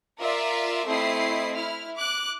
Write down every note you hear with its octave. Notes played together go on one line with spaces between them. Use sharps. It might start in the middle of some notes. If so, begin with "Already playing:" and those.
F4 A#4 D5 E5
A3 C4 E4 D#5 C7
E4 F6
D6 F#6